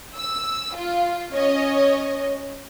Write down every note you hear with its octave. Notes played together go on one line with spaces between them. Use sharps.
E6
F4
C#4 C#5 D#5